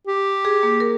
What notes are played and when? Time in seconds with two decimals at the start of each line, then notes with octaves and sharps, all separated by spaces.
0.07 G4
0.45 G#4
0.63 A#3
0.80 A#4